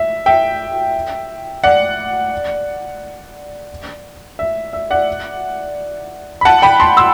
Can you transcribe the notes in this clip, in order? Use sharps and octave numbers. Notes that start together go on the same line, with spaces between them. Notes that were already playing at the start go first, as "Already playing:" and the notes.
Already playing: E5
E5 G5
D5 F#5
E5
E5
D5 F#5
B5
F#5 A5
G5 B5
A5 C6
C6 E6